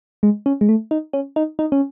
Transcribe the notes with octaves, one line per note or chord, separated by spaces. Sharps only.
G#3
C#4
G#3
A3
D#4
C#4
D#4
D#4
C#4